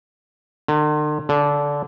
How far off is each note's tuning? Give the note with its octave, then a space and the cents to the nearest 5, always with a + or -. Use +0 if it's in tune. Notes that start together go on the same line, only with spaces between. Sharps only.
D3 +45
D3 -20